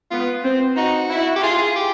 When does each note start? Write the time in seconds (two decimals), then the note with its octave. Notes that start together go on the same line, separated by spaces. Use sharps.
0.11 B3 F4
0.44 C4
0.77 D#4 F#4
1.10 E4
1.36 G4
1.42 F4 G#4
1.59 G#4
1.76 G4